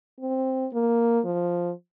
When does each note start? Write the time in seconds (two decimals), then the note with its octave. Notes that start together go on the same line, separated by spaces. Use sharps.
0.20 C4
0.73 A#3
1.25 F3